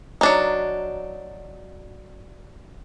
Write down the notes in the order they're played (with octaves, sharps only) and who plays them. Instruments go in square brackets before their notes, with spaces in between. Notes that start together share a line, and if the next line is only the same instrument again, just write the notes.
[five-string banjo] F#3 D4 D#4